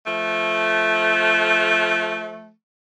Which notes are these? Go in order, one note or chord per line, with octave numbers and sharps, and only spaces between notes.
F3 A3